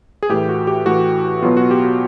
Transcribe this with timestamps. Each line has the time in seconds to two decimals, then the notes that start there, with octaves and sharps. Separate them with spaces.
0.23 G#4
0.29 A2 E3 A3 G4
0.49 F#4
0.67 G4
0.86 A2 E3 A3 F#4
1.42 B2 F#3 B3 F4
1.57 F#4
1.71 G4
1.85 F#4